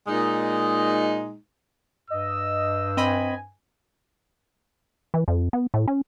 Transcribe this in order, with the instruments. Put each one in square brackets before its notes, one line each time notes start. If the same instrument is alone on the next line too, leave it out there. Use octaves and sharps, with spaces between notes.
[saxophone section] A#2 G#3 D#4
[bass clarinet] G2 [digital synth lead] D#5 [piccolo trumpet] E6
[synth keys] C4 D#5 B5 [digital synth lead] G#5
[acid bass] E3
F2
B3
A2
C#4